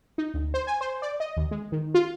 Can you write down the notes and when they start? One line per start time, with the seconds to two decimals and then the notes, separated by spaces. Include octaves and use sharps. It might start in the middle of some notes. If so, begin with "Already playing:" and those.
0.18 D#4
0.34 D2
0.54 C5
0.67 G#5
0.81 C5
1.02 D5
1.20 D#5
1.37 D#2
1.51 G#3
1.72 D#3
1.94 F4